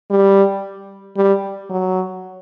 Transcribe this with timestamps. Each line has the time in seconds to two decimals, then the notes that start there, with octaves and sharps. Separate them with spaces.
0.11 G3
1.17 G3
1.70 F#3